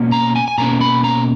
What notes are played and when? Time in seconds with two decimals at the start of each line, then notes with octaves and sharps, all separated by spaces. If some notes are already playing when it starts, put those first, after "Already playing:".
Already playing: B2 A#3 C#4
0.12 A#5
0.36 G#5
0.48 G#5
0.58 B2 A#3 C#4 A#5
0.81 B5
1.04 A#5